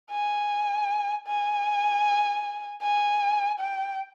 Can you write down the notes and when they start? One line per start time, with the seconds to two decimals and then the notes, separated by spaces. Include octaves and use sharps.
0.11 G#5
1.27 G#5
2.82 G#5
3.60 G5